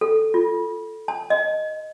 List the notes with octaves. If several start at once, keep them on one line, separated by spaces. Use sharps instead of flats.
A4
F4
A5
D#5